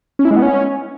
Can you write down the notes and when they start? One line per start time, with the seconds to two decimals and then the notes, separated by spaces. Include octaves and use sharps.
0.19 C#4
0.25 E4
0.31 G#3
0.36 B3
0.42 C#4